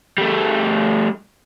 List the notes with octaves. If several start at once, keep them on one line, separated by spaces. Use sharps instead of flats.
G3 A3